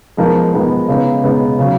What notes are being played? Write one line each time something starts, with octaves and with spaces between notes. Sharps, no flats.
F3 G#3 B3 D#4 A#4
F3 G#3 B3 D#4 A#4
C#3 G#3 B3 D#4
C#3 G#3 B3 D#4
C#3 F#3